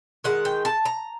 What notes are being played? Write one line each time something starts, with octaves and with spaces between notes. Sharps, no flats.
D#3 G#3 F#5
G5
A5
A#5